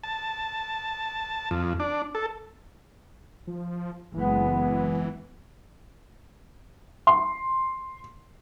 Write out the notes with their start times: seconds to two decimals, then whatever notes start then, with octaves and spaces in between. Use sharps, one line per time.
0.04 A5
1.51 F2
1.80 D4
2.15 A4
3.47 F3
4.14 F#1 E3 G#3 B3
7.07 C6